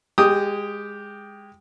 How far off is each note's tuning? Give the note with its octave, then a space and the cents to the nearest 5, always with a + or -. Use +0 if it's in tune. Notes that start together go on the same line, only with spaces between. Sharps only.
G#3 -20 G4 +0 D#6 +0